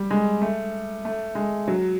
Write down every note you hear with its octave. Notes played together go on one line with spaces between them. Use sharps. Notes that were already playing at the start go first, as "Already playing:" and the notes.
Already playing: G3
G#3
A3
A3
G#3
F#3